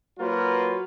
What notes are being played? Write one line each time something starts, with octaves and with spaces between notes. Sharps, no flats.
F#3 A#3 F4 F#4 B4